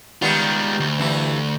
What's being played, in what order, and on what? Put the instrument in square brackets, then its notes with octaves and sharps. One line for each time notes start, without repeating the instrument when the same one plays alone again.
[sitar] D#3 G3 B3 [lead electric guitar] G#3 F4
[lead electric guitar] D2
[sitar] G2 E3 E4